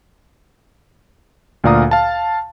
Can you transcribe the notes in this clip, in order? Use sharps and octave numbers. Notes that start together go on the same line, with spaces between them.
D2 A#2 D5 F5 A#5 D#6
F5 A5